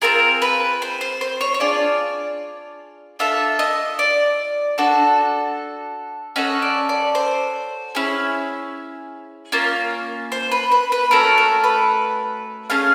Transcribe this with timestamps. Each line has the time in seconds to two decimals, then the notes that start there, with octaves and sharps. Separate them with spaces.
0.02 C4 F4 G#4 A#4
0.42 B4
0.82 C5
1.01 C5
1.21 C5
1.41 C#5
1.54 C#5
1.60 D4 F4 G#4 D5
3.19 D4 F4 A4 E5
3.59 D#5
3.99 D5
4.78 D4 F#4 A4
6.36 C#4 F#4 A4 D#5
6.62 D5
6.89 D5
7.15 C5
7.95 C#4 E4 G#4
9.52 A#3 C#4 F4
10.32 C5
10.52 B4
10.72 B4
10.92 B4
11.11 A3 C#4 F#4 A4 A#4
11.38 A#4
11.64 B4
12.70 A3 C#4 G#4 F5